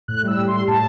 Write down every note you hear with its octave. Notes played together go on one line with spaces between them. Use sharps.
A2 F#6
G3 E6
A2
C6
G3
A2 A5